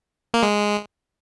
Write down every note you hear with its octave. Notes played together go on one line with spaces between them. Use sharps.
A#3
G#3